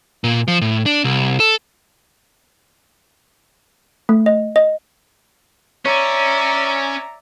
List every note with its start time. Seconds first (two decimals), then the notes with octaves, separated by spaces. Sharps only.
0.24 A#2
0.48 F3
0.61 A2
0.86 D4
1.04 C2
1.40 A4
4.09 A3
4.26 D#5
4.56 D#5
5.86 C#4 C#5 D5 E5 A#5 C#6